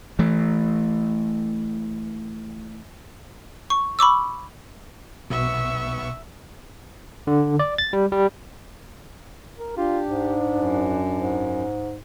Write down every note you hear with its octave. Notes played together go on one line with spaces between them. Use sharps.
E3 A3
C#6
B5 C#6 D6 E6
B1 B2 B3 E5 C#6
D3
D5
A6
G3
G3
A#4
D4 F4 G4
G#2
F#2
G#2